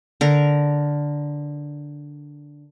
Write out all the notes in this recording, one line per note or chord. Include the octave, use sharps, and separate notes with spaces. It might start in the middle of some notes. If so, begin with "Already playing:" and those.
D3 A#4